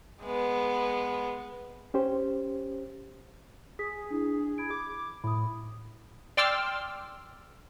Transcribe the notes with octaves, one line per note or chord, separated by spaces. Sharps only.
G#3 B3
C#4 G4 C5
G#4 D#6 B6
D4 E4
B5 G#6 D7
D6
A2 B5 D#6
D5 G5 C6 D6 E6 F6